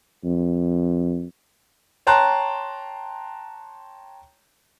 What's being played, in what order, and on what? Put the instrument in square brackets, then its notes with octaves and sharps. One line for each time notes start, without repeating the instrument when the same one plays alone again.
[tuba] F2
[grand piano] C#5 G5 A5 A#5 C6 F#6